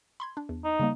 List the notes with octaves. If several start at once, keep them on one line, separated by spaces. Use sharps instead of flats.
B5 C6 G#6
D4
E2
D#4
C#3 G3 A#3